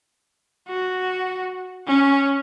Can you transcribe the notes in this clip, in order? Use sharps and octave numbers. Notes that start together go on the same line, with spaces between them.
F#4
C#4